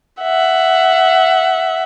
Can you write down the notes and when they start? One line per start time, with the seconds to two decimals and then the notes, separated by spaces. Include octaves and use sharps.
0.22 E5 F#5